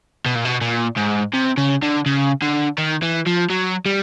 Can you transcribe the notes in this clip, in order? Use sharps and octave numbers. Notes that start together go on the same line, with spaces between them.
B2
A#2
B2
A#2
G#2
C3
C#3
D3
C#3
D3
D#3
E3
F3
F#3
G3